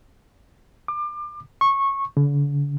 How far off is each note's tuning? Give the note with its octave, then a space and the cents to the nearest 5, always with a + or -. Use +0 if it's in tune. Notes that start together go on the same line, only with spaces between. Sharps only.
D6 +30
C#6 -15
D3 -45